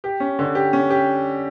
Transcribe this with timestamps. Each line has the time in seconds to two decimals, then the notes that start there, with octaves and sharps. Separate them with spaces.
0.04 G4
0.20 C#4
0.39 D3
0.55 G4
0.73 C#4
0.90 G4